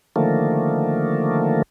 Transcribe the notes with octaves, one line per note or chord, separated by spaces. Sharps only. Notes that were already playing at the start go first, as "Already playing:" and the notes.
D3 D#3 F3 A3 A#3